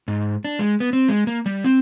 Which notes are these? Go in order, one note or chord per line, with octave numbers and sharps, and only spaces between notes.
G#2
D4
G#3
B3
C4
G#3
A#3
G3
C4